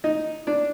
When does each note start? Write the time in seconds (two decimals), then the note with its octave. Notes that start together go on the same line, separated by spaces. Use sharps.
0.04 D#4 D#5
0.47 D4 D5